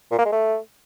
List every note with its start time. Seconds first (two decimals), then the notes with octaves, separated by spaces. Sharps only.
0.11 A#2
0.18 A#3
0.25 G#3
0.33 A3